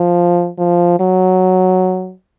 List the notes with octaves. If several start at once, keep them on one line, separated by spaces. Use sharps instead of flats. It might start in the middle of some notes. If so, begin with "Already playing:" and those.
Already playing: F3
F3
F#3